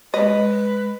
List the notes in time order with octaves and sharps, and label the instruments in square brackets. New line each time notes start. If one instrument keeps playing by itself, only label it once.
[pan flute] G#3 [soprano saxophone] B4 [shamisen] D#5